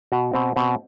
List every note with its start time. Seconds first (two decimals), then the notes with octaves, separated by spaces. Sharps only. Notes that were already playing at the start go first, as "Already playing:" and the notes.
0.12 B2 F#4
0.34 B2 C4
0.56 B2 C4